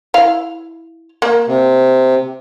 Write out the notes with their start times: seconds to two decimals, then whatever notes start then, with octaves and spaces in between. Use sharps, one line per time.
0.14 E4 F5
1.22 A#3
1.48 C3